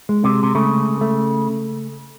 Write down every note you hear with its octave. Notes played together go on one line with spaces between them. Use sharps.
G#3
C3
C3
C#3 A3
A3